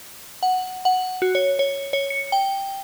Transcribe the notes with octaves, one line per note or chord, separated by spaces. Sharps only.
F#5
F#5
F#4
C#5
C#5
C#5
C#7
G5